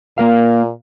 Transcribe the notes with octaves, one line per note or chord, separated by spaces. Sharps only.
A#2 A#3 A#4 F5